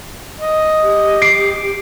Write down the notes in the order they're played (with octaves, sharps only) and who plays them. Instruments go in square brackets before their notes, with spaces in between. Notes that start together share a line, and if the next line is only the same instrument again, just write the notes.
[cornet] D#5
[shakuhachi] G4
[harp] D6 C7 D7